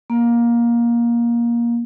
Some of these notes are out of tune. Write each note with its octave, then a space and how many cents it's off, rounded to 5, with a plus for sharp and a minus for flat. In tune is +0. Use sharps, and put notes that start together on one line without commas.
A#3 +15